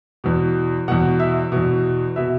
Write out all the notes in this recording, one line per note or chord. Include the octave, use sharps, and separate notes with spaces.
E2 B2
E2 B2 F#5
E5
E2 B2
B2 E5